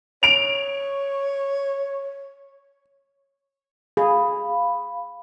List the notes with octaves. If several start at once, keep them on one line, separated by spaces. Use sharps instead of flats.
C#5 D7 F7
G#4 F5 B5